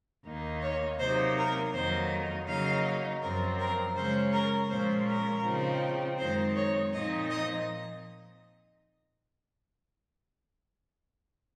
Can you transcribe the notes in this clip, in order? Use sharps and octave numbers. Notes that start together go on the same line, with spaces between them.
D#2 D#3 A#3 D#4
C#5
C3 F#3 A#3 D#4 C5
A#4
F2 D#3 F#3 A#3 D#4 C5
C#3 F#3 A#3 D#4 F5
F#2 F3 C4 A#4
A#4
C#3 G#3 C#4 C5
A#4
A#2 F3 G#3 C#4 C5
A#4
C#3 F3 C4 D#4
F#2 D#3 G#3 C4 D#4 C5
C#5
A#2 F3 C4 D#4 D#5
D#5